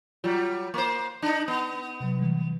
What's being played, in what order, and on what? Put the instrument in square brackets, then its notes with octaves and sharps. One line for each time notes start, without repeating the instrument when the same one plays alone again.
[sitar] F#3 G3 [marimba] F4
[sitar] A#3 C5 [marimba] C#6 D6
[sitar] D4 D#4
B3
[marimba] C3 F#3
E3 G3